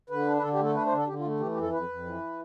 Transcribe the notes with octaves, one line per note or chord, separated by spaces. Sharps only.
D3 B4
D4
B4
D3 A4
G4
A3 A4
D4 B4
C5
D3
A4
D3 G4
F4
A3
E3 G4
G4
F2
A4
F2 B4
F2
E3